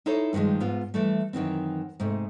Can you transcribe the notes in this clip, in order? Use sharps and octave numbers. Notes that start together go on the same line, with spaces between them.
D#4 E4 A4 C5 C#5 E5
G2 D3 D#3 F3 G#3
G#2 B3 F4
E3 G3 A3
F#2 D#3 E3 C4
G#2 C3 A3